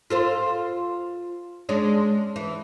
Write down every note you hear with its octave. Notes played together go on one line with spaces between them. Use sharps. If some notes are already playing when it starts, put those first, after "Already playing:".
F4 A4 C5
G#3 C#4 D4
E3